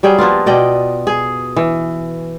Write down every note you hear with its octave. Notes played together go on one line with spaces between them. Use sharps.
F#3 G3 G#4 G5
F3 A#3 B3 F4
B2 D5 D#5 G5
G#4
E3